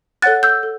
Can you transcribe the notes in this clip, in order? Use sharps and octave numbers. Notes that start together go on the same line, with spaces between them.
A4 C#5 F#5 F#6 A6
E6 G6
A4